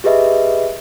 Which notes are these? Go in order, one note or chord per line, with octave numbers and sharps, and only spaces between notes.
G4 G#4 B4 D#5 E5